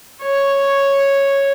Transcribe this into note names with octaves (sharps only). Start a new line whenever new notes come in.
C#5